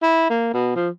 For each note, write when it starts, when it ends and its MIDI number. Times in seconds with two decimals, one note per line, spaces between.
0.03 0.29 64
0.30 0.51 58
0.54 0.72 47
0.76 0.89 53